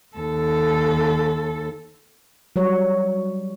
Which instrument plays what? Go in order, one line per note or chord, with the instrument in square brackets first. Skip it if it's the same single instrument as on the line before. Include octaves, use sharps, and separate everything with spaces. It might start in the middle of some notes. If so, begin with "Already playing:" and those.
[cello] D#2 A4
[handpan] F#3 G3 C#5